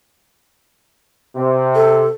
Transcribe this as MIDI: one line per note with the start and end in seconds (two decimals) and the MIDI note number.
1.36 2.05 48
1.75 2.07 69